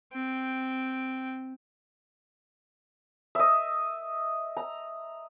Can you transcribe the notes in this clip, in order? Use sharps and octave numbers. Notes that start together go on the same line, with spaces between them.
C4 G5
D#5 E5
A#5